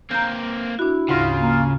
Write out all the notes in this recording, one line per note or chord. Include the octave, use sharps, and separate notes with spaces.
A#3 C4 A#5 G6
D4 E4 F#4
D2 G#2 C#3 F4 A#6
A#3